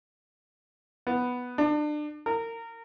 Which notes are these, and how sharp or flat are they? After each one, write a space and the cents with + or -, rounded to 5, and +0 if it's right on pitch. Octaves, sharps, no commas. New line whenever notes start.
B3 +0
D4 +30
A#4 -25